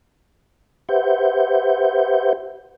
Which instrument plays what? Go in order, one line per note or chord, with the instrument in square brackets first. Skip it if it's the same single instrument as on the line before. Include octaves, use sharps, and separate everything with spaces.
[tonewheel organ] G4 B4 C5 E5 F#5 G6